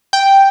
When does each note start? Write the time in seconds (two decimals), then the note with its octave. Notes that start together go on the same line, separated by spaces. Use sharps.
0.13 G5